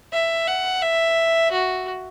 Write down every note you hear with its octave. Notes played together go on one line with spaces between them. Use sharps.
E5
F#5
E5
F#4